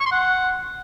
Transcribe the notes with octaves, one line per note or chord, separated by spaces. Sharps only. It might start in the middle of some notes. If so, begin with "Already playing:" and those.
C#6
C6
F#5